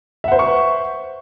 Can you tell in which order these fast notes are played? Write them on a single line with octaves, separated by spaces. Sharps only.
E5 F#5 C5 B4 C#6